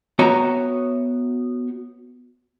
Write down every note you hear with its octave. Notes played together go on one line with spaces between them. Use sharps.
B3 F#4 C#5 E5 G5 A#5